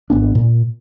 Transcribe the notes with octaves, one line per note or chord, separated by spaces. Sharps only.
G#1 B3 D4
A#2